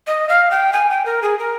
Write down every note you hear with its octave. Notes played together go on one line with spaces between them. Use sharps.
D#5
F5
G5
G#5
G5
A#4
G#4
A#4